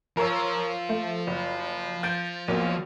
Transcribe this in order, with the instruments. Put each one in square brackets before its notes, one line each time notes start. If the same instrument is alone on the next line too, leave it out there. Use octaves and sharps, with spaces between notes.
[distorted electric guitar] F3 [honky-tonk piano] A#4 C#5 E6
[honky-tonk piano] A3
F#1
G6 A6 D7
B1 E2 A#3